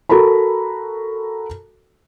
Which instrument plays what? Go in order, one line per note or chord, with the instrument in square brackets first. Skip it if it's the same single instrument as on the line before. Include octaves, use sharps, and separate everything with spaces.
[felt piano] F#4 A4 A#4 A#5 B5